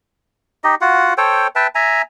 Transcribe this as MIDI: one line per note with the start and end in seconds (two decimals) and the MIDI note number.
0.64 0.75 63
0.64 0.75 67
0.64 0.75 75
0.81 1.14 65
0.81 1.14 66
0.81 1.14 78
1.18 1.47 69
1.18 1.47 72
1.18 1.47 73
1.18 1.47 79
1.55 1.67 71
1.55 1.67 76
1.55 1.67 79
1.55 1.67 81
1.75 2.02 76
1.75 2.02 80
1.75 2.02 82